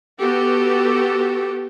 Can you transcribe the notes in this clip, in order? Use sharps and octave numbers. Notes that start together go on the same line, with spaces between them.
B3 F#4 G4 A4